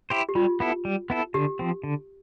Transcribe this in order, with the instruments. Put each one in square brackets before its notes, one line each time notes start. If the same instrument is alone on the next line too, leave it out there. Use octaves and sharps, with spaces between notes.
[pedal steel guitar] E4 G4 C5
[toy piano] G4
[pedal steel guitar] G3 [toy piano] F4
[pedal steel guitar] B3 E4 A4
G3
B3 E4 A4
[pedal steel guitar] D3 [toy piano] G4
[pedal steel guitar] F3 C4
D3